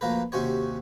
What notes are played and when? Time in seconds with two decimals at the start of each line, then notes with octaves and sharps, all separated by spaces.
0.01 D2 F3 A#3 A#4 B4
0.32 D#2 C3 C#4 F#4 C5 C#5